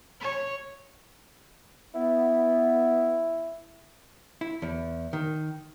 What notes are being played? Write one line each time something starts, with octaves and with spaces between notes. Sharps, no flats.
C#5
B3 E4
E4
E2
D#3